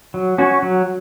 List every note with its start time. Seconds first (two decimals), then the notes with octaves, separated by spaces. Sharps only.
0.14 F#3
0.38 C#4 F#4 C#5
0.62 F#3